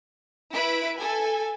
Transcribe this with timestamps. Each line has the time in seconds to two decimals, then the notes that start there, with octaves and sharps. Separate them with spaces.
0.52 E4 B4 B5 D7
0.97 A4 G#5